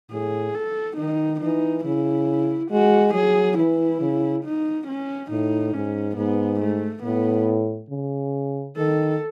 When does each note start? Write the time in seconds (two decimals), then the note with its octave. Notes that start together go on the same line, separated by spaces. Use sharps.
0.11 A2 G#4
0.54 A4
0.98 D#3 D#4
1.41 E3 D#4
1.85 C#3 E4
2.71 G#3 F#4
3.14 F#3 G#4
3.58 E3 E4
4.01 C#3
4.44 D#4
4.88 C#4
5.30 A2 D#4
5.73 G#2 C#4
6.17 G#2 B3
6.61 A3
7.03 A2 B3
7.90 C#3
8.77 D#3 A4